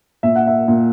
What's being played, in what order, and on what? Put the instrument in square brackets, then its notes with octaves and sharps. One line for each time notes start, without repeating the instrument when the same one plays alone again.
[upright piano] A#2 E5
F#5
E5
A#2